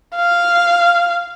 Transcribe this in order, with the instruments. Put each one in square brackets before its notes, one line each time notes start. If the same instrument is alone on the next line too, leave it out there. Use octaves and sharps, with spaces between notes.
[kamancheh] F5